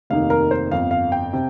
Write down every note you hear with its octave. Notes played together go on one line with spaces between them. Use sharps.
F1 D#2 D#3 A#3 D#4 F5
A#4
C5
G1 F2 F3 F5
F5
G5
C3